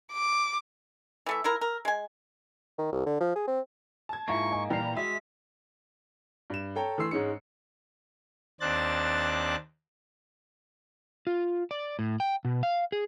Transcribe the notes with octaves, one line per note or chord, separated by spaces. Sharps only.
D6
E3 A3 E5
F3 E4 A#4
A#4
G#3 G#5
D#3
C2
D3
F3
G#4
C4
A5 G#6
G#2 A#3 E4 F4 E5 C#6
D#5 G#5
A#2 E3 G3 G5 A#5 F6 C7
G#3 F#4 E5 B6
G2 E7
A4 C#5 G5 A#5
E3 A3 C6 E6 C7
G#2 G#3 C#4 D#4 C#7
D#2 C4 D4 F#6 A6
F4
D5
A2
G5
B2
F5
G#4